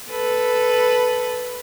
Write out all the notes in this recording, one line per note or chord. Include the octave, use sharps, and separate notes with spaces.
A4 B4